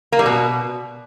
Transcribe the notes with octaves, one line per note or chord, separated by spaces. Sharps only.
A#3
G3
B2